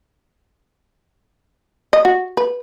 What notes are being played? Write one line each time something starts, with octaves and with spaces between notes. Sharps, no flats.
D#5
F#4
B4